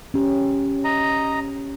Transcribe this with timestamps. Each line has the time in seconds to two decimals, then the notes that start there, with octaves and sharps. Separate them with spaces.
0.14 C#4 G4
0.84 D#5 A#5